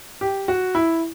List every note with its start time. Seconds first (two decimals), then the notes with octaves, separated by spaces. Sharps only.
0.21 G4
0.48 F#4
0.75 E4